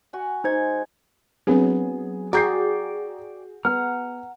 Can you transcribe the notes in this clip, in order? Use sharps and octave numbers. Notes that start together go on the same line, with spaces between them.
F#4 F#5 G#5
G#3 D#4 C5 G#6
F#3 B3 C4 D4 G#4
F#4 G#4 D5 G5 A#5 G6 C7
B3 F#5 A#5 F6